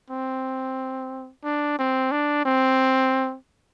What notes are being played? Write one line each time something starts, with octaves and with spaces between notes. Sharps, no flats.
C4
D4
C4
D4
C4